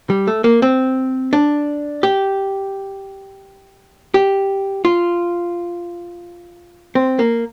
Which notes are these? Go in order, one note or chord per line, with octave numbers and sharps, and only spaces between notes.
G3
A3
A#3
C4
D4
G4
G4
F4
C4
A#3